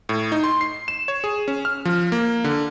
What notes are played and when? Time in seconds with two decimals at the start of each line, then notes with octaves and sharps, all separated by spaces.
0.09 A2
0.32 D#4
0.44 C6
0.61 C7
0.88 E7
1.08 C#5
1.24 G#4
1.48 C#4
1.65 F6
1.85 F3
2.12 A#3
2.44 D3